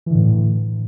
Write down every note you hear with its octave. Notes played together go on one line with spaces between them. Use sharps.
A2 D3 E3